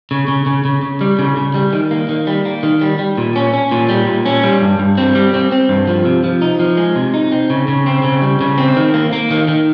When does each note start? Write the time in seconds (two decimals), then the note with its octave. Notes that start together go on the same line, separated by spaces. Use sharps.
0.11 C#3
0.28 C#3
0.46 C#3
0.65 C#3
0.83 C#3
1.01 G3
1.19 C#3
1.37 C#3
1.54 G3
1.73 D#3
1.91 A#3
2.09 D#3
2.27 G3
2.45 A#3
2.63 D#3
2.81 G3
2.99 G3
3.18 A#2
3.36 C#4
3.53 C#4
3.72 A#2
3.89 G3
4.07 A#2
4.26 C#4
4.43 G3
4.62 G2
4.79 G2
4.98 C4
5.15 G3
5.34 C4
5.52 C4
5.69 G2
5.88 F3
6.05 C3
6.24 F3
6.42 D#4
6.59 F3
6.78 G#3
6.96 C3
7.14 D#4
7.32 C4
7.50 C#3
7.68 C#3
7.86 C4
8.04 C#3
8.22 G3
8.41 C#3
8.58 C4
8.76 D#3
8.94 A#3
9.13 A#3
9.31 D#3
9.48 D#3